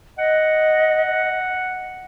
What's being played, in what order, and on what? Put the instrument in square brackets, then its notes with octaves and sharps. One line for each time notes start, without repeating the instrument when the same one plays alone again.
[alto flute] D#5 [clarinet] F#5